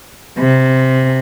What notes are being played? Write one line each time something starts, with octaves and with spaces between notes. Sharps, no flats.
C3